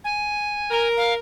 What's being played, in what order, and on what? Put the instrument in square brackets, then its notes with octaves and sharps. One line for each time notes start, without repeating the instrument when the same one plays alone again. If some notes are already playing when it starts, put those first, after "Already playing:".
[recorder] G#5
[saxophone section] A#4
[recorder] F5